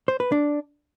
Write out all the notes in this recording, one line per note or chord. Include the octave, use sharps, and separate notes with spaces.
C5
B4
D4